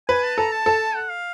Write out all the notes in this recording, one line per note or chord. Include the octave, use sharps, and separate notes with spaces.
B4 G#5
A5
A4 A#5
A5
A4
F#5
F5